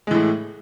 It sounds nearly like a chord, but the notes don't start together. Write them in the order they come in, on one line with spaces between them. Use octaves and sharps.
G#3 E3 A2